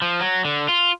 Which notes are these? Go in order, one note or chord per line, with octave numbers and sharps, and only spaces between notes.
F3
F#3
D3
F4